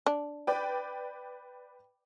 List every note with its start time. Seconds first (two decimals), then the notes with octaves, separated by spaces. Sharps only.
0.06 D4
0.47 B4 D5 G5